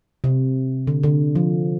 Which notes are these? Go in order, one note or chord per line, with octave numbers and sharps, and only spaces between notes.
C3
D3
D3
F3